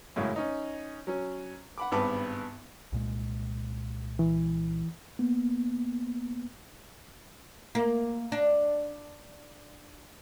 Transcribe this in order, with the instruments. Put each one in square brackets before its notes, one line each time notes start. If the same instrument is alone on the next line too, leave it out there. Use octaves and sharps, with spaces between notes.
[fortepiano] F#2 A2 C#3 G#3
C#4 D#4
F#3 C#4
F#5 B5 D6
G#1 G2 B3 B4 A5 D6
[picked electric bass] C2 A#2 G#3
[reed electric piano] E3
[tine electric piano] A#3 B3
[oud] A#3
D4